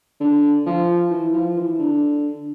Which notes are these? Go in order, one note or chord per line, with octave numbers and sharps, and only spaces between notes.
D3
F3
E3
F3
E3
D3